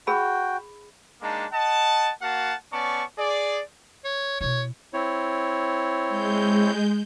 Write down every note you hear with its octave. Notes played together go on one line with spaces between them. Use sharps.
F#4 G#4 G5 B5
G#3 A#3 D4 D#4 A5
D#5 F#5 A5
A#3 F#4 F5 F#5 A5
B3 C#4 D5 A5 C#6
G#4 D5
C#5
B2 E4 C#5
C4 E4 C#5
G#3 G6